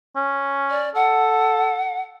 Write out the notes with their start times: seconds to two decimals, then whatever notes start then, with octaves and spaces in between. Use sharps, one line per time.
0.16 C#4
0.70 D5
0.95 A4 F#5